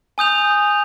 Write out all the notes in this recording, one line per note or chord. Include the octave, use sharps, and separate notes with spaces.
G#5 D#6 G6 F7